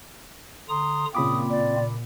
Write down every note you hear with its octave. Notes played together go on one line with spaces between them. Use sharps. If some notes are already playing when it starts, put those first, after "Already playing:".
D3 A#5 C6 D#6
A#2 C#3 A#3 C4 F4 B5 D6 D#6
D5